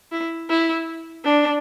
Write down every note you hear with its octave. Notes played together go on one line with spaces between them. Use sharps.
E4
E4
D4